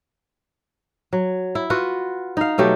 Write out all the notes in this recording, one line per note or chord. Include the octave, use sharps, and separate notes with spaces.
F#3
E4
F4 F#4 B4
D#4 F5
B2 F#3 A3 G4